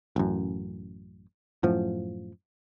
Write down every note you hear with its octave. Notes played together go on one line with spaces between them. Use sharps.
A1 F#2
F#2 A2 F3